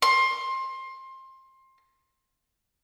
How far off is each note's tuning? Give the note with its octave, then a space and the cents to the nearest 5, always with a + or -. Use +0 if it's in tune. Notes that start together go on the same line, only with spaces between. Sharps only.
C6 +20